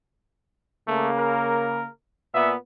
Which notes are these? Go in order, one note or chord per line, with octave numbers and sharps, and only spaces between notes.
C#3 A3 A#3
A#4
A#2 B3 E5